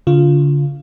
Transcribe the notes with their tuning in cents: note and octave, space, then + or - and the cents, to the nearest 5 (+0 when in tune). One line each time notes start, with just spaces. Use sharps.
D3 -40 F4 +0